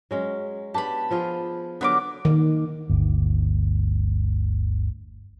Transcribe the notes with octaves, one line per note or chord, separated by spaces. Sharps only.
F#3 G#3 C#4
B3 D4 G4 A5 B5
F3 F4 G#4
D3 F#3 B3 A#4 B5 D6
D#3
G1 D2